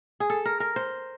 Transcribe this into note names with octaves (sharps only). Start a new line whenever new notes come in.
G#4
A4
A#4
A#4
C5